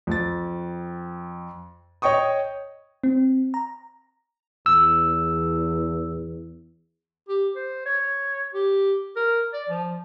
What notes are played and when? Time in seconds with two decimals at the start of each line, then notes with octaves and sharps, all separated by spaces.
0.07 F2 A6
2.02 C#5 D#5 G5 C#6 D#6
3.04 C4
3.54 A#5
4.66 E2 E6
7.28 G4
7.56 C5
7.86 C#5
8.54 G4
9.16 A#4
9.54 D5
9.69 F3